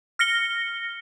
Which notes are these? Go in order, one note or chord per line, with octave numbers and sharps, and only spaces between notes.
F6 A#6 C#7 G7